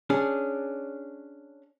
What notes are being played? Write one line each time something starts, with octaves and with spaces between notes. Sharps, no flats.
C#4 D4 G#4